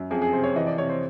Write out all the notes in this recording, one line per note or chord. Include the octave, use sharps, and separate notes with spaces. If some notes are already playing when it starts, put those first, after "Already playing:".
Already playing: F#2
F2 G#4
G#4
C3 C5
C#5
E3 D#5
D5
C3 C#5
C5